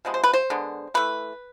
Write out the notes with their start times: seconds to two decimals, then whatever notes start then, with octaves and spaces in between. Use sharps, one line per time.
0.05 C3 F3 G#3 B3
0.14 C5
0.24 B4
0.34 C5
0.50 D3 G#3 B3
0.94 E3 A3 B4